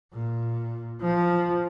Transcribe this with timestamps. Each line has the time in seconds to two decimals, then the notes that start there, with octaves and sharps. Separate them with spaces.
0.13 A#2
1.02 F3